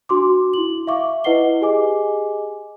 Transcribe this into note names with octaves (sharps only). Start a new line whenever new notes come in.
D4 F#4 C6 D6
E4 F#7
E5 F5 C#6 D6
E4 B4 D#5 F#5 C7 G7
G4 G#4 D#5 G#5 D6